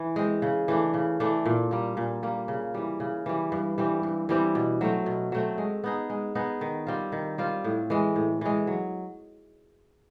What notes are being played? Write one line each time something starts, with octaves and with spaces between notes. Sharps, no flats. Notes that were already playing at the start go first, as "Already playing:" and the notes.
Already playing: E3
G#3 C4
C#3
E3 A3 D4
C#3
E3 A3 D4
A#2
G3 A#3
A#2
G3 A#3
C#3
E3 G3
C#3
E3 G3
G2
E3 G3 C4
G2
E3 G3 C4
B2
F#3 A3 C4
B2
F#3 A3 C4
G#3
B3 D#4 G#4
G#3
B3 D#4 G#4
D#3
G3 C4 F4
D#3
G3 C4 F4
A2
E3 G#3
A2
E3 G#3
F#3